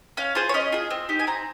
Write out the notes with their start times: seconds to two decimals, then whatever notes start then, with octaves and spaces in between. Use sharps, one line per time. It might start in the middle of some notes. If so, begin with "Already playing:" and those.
0.17 C#4 F5
0.35 F4 G#4 C5
0.49 C#5
0.54 C#4 D#5
0.72 F4 G#4
0.91 C4
1.09 D#4 G4
1.19 G#5
1.27 C4 A#5